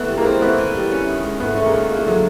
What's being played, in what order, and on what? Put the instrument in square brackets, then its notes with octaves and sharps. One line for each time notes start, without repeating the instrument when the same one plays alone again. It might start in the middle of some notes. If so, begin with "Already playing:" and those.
Already playing: [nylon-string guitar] E3 [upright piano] A3 B3
[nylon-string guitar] G3
[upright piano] G#3 A#3
[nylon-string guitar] C4
[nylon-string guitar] E3 [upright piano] A3 B3
[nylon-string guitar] E3
G3
C#4
D#3
G#3
[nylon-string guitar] G#2 [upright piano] A3 B3
[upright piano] A3 [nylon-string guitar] C#4
[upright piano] G#3 A#3
[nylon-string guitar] D#3
[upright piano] G#3 [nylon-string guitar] A#3
[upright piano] A3
[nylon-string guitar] D3 [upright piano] F#3 G#3